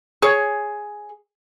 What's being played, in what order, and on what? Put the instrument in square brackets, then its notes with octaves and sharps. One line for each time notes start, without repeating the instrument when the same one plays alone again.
[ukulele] G#4 C#5